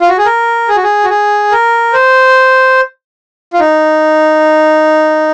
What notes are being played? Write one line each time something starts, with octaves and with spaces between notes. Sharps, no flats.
F4
F#4
G#4
A#4
G#4
F#4
G#4
F#4
G#4
A#4
C5
F4
D#4